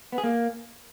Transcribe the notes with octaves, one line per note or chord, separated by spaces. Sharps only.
B3
G#4
A#3